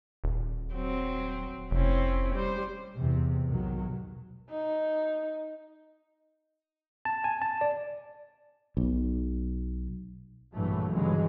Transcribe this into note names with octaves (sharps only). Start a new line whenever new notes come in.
D#1
F#3 C4
F1 C4 C#4 E4
G3 C5
E2 G#2 C3
B1 G#2 D#3 F#3
D#4
A5
G#5
A5
D5
B1
A#1 G2 A#2 E3 F#3 A3
G1 G2 C#3 E3 F#3 G#3